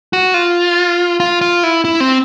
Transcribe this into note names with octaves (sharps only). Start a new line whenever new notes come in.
F#4
F4
F4
F4
E4
E4
C4